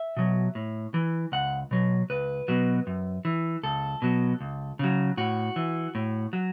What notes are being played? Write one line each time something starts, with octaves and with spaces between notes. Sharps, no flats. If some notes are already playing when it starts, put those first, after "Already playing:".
Already playing: E5
B2 F#3
A2
E3
C#2 F#5
B2 F#3
C#2 B4
B2 F#3
F#2
E3
C#2 A4
B2 F#3
C#2
C#3 F#3
A2 F#4
E3
A2
F#3